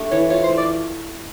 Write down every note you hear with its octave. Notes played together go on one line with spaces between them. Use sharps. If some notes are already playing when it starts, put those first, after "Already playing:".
Already playing: A3 D4 G4
E3 C#5
F4 C#5
C5
A3
D5